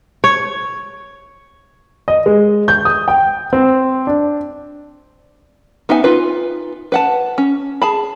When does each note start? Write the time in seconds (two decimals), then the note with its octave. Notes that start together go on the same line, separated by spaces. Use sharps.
0.24 C#5
2.08 D#5
2.26 G#3
2.68 G6
2.85 D#6
3.08 G5
3.53 C4
4.07 D4
5.89 B3 D#4 E5 G5 G#5
6.04 D#4 F4 B4
6.92 B4 F#5 A5
7.38 C#4
7.82 G#4 A5 B5